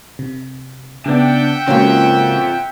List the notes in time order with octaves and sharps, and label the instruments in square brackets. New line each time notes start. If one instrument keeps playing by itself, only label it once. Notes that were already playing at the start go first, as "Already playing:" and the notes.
[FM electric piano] C3
[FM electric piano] C#3 B3 [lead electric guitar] D4 D5 [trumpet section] E5 F#5 G5
[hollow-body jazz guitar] C#2 G#2 A#3 [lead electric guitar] C4 F4 [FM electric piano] C#4 F#4